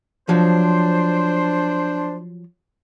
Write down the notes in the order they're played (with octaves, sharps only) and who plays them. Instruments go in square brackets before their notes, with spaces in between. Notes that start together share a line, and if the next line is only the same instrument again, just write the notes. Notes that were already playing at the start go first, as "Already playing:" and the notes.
[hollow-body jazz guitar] F3 F#3 [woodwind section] D4 C5